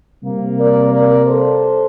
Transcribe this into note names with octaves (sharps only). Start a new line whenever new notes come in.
C3 G3 A#3
A#4 D5
A#4 D5
A4 C5